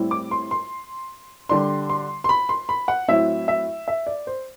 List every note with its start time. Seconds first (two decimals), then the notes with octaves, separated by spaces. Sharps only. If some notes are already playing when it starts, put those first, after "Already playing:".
Already playing: A2 G3 C4 E4
0.11 D6
0.31 C6
0.51 C6
1.49 D3 G3 D4 C6
1.90 C6
2.24 C6
2.29 B5
2.49 C6
2.69 B5
2.88 F#5
3.08 A2 F#3 C4 E4 E5
3.48 E5
3.88 E5
4.07 D5
4.27 C5